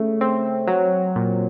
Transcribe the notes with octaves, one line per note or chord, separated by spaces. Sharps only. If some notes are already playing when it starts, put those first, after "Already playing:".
Already playing: C#3 A3
C4
F#3
A#2